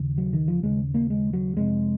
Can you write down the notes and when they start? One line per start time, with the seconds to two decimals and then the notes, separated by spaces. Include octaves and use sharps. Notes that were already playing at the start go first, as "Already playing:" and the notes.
Already playing: D#2 C#3
0.18 F#3
0.33 D#3
0.48 F3
0.63 D#2 C#3 G#3
0.94 A#3
1.10 G#3
1.33 F#3
1.56 F2 C3 G#3